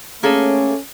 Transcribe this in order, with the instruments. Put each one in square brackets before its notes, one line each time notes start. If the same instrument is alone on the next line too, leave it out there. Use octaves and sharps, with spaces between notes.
[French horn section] A3 C#4 [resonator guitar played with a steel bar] A#3 G#4 A4